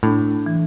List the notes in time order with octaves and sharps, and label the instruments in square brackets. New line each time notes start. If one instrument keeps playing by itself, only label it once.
[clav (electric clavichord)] A2 [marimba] D4
[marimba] E3